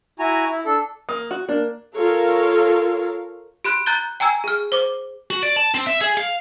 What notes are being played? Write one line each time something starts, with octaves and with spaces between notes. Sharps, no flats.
E4 F#4 G#5 A#5
E4
D4 A4
A#3 D#6
F#4
A#3 D4
F4 A4 A#4 C#5 F5
G4 B5 F#6
A#5 F#6 G6 A6 G7
G5 G#5 A#5 E6 G#6
G#4 F6
C5 D6
F#4
D5
A5
C4
E5
G#4
F5